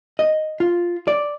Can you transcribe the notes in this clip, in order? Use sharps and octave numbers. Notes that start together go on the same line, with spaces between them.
D#5
F4
D5